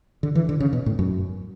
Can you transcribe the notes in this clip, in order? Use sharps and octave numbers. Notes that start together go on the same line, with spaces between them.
D3
E3
D3
C#3
B2
A2
F#2